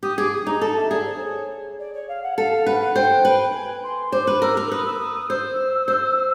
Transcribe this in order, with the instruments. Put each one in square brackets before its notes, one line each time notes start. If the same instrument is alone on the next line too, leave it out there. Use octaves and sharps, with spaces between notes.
[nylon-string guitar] G4 [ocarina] D#6
[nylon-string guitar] G#4 [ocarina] D6
[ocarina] D#6
[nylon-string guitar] D#4 [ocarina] A#5
[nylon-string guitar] A4 [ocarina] A5
[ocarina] E5
[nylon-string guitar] G#4 [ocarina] D5
[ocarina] C5
C#5
D5
C#5
F5
F#5
[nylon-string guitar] A4 [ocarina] F5
[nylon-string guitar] B4 [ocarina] F#5
[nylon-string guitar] C5 [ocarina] G5
[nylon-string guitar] B4
[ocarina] G#5
C6
[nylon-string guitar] C5 [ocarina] D6
[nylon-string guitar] B4
[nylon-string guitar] A#4 [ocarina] E6
[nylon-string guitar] A#4
[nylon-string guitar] B4 [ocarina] D#6
[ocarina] E6
D#6
D#6
[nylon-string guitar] C5 [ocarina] E6
[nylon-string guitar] C5